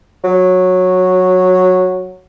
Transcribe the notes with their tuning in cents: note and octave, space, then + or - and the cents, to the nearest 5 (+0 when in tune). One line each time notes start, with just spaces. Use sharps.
F#3 -10